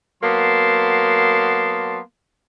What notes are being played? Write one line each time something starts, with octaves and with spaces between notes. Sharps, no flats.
F#3 A#3 B3 A5 C6